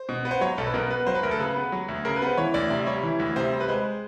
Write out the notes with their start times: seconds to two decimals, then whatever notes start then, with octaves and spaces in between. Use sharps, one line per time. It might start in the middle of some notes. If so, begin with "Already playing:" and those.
Already playing: C5
0.09 B2
0.25 B3
0.31 C5
0.41 F#3 C#5
0.58 B1 A4
0.66 B4
0.74 B2 A#4
0.90 B3 B4
1.07 F#3 C5
1.15 B4
1.23 D2 A#4
1.31 A4
1.39 C#3 B4
1.56 B3
1.72 F#3
1.88 D2
2.05 C#3 A#4
2.16 B4
2.22 B3 C5
2.37 E3 C#5
2.54 D2 D5
2.70 C3 D5
2.86 G3 C#5
3.03 E3
3.19 D2
3.36 C3 C5
3.53 G3
3.60 B4
3.68 G#3 C5